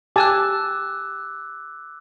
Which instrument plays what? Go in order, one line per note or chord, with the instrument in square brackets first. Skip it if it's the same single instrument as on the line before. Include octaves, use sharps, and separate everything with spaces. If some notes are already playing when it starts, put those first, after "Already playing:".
[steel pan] G4 G#5 A5 [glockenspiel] D6 E6 F#6